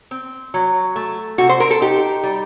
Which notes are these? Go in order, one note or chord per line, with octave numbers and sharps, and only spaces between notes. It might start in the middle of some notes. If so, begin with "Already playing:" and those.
C4
F#3
A3
C3 F#4
C5
A#4
A4
D#4 G4
G3